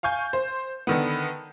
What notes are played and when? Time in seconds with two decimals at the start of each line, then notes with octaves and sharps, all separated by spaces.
0.03 F5 G#5 C#6 G6
0.33 C5
0.87 D3 D#3 B3